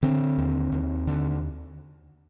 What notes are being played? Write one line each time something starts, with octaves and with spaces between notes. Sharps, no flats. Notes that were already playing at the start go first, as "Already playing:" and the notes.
D3 C4
D#2
D#2
D3